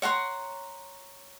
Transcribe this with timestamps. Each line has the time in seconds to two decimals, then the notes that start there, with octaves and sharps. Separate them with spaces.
0.02 C#5 F#5 A#5 C6